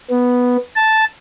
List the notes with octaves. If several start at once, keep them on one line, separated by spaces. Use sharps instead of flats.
B3
A5